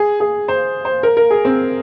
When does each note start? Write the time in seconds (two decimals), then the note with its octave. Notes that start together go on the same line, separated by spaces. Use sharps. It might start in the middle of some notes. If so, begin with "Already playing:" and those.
Already playing: G#4
0.20 G#4
0.48 C5
0.85 C5
1.03 A#4
1.17 A#4
1.30 G#4
1.45 C4